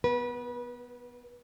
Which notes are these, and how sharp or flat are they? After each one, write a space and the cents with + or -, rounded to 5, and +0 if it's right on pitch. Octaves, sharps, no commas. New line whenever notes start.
B3 +0 B4 -30